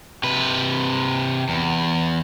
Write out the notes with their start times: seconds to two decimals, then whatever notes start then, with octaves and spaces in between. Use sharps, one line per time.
0.23 C3 B4
1.49 E2